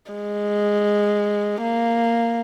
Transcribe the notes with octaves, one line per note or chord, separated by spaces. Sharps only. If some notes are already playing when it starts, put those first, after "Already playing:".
G#3
A#3